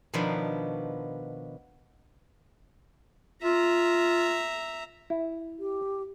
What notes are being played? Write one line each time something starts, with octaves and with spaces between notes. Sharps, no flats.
B2 D#3 F3 B3 D4
F4 E5 A#5
E4
G4